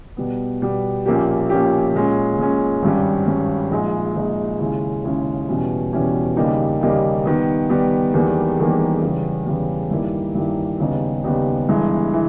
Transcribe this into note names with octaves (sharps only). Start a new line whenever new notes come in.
B2 G3 B3
B2 G3 B3
A#1 A#2 A#3 C#4 G4
A#1 A#2 A#3 C#4 G4
A#2 G#3 C#4
A#2 G#3 C#4
G#1 G2 G3 C#4
G#1 G2 G3 C#4
A#1 A#2 G#3 D#4
A#1 A#2 G#3 D#4
D#2 C#3 G#3 C#4 E4
D#2 C#3 G#3 C#4 E4
E2 B2 G3 C#4 E4
E2 B2 G3 C#4 E4
D#2 C#3 G3 A#3 D#4
D#2 C#3 G3 A#3 D#4
D#3 G3 B3
D#3 G3 B3
E1 E2 D#3 G3 A#3
E1 E2 D#3 G3 A#3
E2 C#3 G3
E2 C#3 G3
G2 D#3 G3 A#3 E4
G2 D#3 G3 A#3 E4
D#2 C#3 G3 B3 D#4
D#2 C#3 G3 B3 D#4
G1 G2 E3 G#3
E3